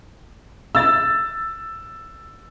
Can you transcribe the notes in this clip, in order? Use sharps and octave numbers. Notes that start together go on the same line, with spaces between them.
E6 A6